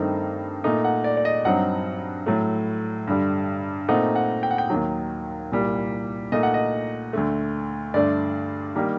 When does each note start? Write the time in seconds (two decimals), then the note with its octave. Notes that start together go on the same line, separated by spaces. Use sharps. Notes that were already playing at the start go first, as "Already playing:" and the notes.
Already playing: G2 D#3 A3 C4 D#4
0.64 A#2 A3 D#4
0.84 F#5
1.04 D5
1.17 D5
1.25 D#5
1.45 G2 F#3 C4 D#4 F#5
2.26 A2 F#3 A3
3.07 G2 D3 G3
3.89 A#2 A3 C4 D#4 F#5
4.16 F#5
4.43 G5
4.51 F#5
4.58 G5
4.70 D#2 D#3 F#3
5.51 C2 A#2 G3
6.32 A#2 A3 D#4 D#5
6.43 F#5
6.54 D#5
7.13 D2 D3 A3
7.94 G2 D3 A3 D4 D5
8.76 D#3 G3 A#3